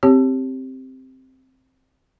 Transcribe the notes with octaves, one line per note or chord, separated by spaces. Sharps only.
C4 G4 C#5